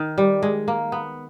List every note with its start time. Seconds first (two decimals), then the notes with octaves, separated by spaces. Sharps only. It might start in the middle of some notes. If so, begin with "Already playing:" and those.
Already playing: D#3
0.18 G3
0.43 G#3
0.68 A#3
0.92 B3